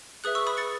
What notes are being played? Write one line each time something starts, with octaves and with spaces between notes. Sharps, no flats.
G#4 B4 E5 D#6 F#6
C#6 E6
B5 D#6
A6 C#7